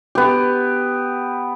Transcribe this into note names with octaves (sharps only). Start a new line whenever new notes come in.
B3 G4